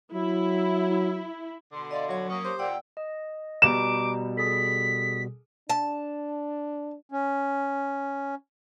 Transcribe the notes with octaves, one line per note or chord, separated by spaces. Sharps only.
F#3 E4
B2 D3 C6
D5 D#5 F5 C6
F#3 F#4 C#5 C#6
A#3 C#4 D#6
G4 C5 D6
A#2 D5 F#5 G5 E6
D#5
B2 G3 A#5 D6 E7
G#4 A4 B6
D4 A5
C#4